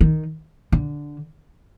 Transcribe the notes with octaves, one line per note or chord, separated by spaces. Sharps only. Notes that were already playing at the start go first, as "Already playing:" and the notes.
D#3
D3